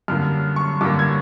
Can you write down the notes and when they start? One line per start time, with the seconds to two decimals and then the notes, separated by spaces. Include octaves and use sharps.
0.08 F#2 D3 G3 A#3 F6
0.56 C#6
0.81 F#2 D3 G3 A#3 D6
0.99 G#6